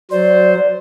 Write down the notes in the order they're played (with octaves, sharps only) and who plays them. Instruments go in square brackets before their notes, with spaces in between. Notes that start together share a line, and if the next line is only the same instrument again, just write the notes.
[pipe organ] F#3 C5 [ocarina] D5